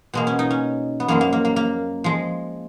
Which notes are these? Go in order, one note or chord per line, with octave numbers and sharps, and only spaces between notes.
B2 G#3 A#3
C#4
D#4
C#4
B3
F#2 F3 G#3 A#3
A#3
A#3
A#3
A#3
F3 G#3